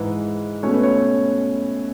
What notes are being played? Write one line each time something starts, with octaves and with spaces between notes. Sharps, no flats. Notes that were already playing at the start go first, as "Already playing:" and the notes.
Already playing: G#2 E3 G#3 B4
B2 A3 C#4 C#5
B4
C#5